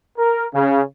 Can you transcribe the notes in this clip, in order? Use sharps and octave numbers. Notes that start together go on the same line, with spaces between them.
A#4
C#3